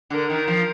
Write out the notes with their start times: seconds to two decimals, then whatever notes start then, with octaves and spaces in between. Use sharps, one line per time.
0.10 D3 A#4
0.30 D#3
0.48 F3